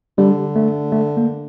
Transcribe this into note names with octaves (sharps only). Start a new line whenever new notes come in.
D3 G3
A3
A3
A#3